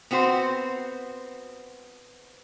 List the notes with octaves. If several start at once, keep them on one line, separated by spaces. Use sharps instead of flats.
B3 C4 F#4 C5